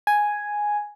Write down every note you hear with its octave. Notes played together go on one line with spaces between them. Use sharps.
G#5